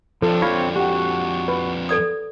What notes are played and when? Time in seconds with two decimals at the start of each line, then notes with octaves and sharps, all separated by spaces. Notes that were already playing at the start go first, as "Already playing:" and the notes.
0.22 F2 F3 D4 A4
0.42 C4 F4 C#5 F5
0.76 F#4 G4 F#5
1.48 B4
1.89 A4 D5 D#6